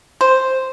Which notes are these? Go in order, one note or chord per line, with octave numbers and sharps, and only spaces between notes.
C5